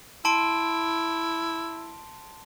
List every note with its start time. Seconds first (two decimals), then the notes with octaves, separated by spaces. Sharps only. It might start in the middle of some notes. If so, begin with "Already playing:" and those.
0.25 E4 A5 C6 D7